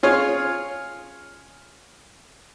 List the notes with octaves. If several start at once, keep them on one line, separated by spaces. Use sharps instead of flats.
C#4 F4 G#4 C#5